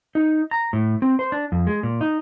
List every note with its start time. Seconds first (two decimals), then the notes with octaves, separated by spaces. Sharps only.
0.15 D#4
0.51 A#5
0.73 A2
1.02 C4
1.19 C5
1.32 D4
1.52 F2
1.67 G#3
1.83 A#2
2.01 D#4